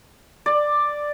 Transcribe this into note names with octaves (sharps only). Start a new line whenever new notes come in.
D5